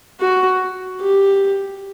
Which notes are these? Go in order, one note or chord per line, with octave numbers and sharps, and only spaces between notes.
F#4
G4